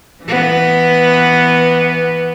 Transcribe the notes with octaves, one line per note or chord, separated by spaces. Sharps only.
E3 B3